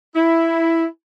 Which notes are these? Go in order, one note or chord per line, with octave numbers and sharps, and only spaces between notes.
E4